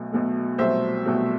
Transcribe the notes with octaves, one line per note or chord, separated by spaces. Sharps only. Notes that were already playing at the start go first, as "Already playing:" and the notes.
Already playing: B1 B2 A3
B1 B2 A3
C2 B2 F#3 A3 C5 E5
C2 B2 F#3 A3